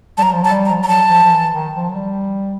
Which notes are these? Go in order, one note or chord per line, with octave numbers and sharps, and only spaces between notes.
G3 A5
F#3 A#5
F3
F#3 A5
G3
A#5
F3
F#3 A#5
A5
F3
F3
E3
D#3
F3
F#3
G3